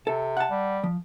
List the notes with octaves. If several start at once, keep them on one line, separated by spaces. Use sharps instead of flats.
C3 A4
F#5 A5
G3
F3